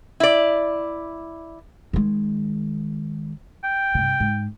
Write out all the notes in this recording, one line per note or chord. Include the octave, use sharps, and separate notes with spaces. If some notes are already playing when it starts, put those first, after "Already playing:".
E4 D5
D#3 G#3
G5
G2 C3
G#2